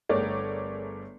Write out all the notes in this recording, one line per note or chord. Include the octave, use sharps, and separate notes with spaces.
G1 A3 G#4 A#4 C#5 D5